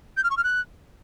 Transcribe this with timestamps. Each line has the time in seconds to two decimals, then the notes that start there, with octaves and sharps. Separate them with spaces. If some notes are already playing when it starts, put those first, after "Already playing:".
0.17 G6
0.24 F6
0.30 C#6
0.37 F6
0.44 F#6